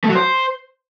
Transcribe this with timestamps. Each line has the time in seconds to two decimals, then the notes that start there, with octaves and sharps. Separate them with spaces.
0.04 A3
0.10 F#3
0.15 C5